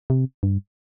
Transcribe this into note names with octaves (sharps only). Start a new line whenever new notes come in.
C3
G2